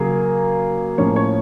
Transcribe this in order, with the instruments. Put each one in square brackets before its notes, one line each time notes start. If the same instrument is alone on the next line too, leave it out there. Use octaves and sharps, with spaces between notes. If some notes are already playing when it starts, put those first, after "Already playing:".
Already playing: [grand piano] C#3 F#3 A#3 G#4
A2 F3 A#3 C#4 C#5
C#5